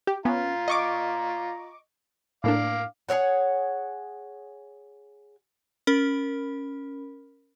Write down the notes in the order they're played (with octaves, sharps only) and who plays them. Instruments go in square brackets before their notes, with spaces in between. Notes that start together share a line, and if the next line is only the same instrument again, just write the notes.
[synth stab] G4
[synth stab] B3 C#4 [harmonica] F4 A#5
[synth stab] D#5 C#6 D6
[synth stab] A2 A#3 D4 [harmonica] F5 D6
[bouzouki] G#4 A#4 C#5 F#5
[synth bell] C#4 A#4 B5